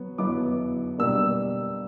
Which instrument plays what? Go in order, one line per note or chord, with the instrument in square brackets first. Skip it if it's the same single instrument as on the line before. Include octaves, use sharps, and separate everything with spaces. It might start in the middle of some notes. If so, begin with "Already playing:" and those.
Already playing: [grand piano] F#3 B3
F#3 B3 E4 D6
B2 G3 A#3 D4 E6